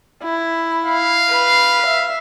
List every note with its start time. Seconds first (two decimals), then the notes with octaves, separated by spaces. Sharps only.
0.23 E4
0.85 F5
1.28 B4
1.86 E5